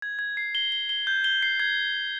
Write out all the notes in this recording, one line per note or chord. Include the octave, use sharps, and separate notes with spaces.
G#6
G#6
C7
G7
G7
G7
G6
G7
C7
G#6